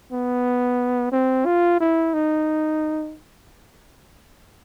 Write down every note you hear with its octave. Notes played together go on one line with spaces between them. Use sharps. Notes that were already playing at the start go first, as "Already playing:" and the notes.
B3
C4
F4
E4
D#4